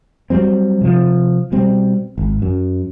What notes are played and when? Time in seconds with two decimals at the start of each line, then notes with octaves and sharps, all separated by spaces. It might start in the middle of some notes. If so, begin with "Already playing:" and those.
0.30 F#3 G3 C4
0.81 C3 F3
1.52 B2 G3 C4
2.18 G#1
2.42 F#2